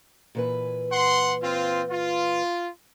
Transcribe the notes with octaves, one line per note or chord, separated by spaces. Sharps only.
A#2 E3 B4
F#5 C6
C4 F4
F4